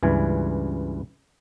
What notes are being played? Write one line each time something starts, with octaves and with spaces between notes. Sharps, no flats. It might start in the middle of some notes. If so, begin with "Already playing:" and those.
C#2 G2 E3 G#5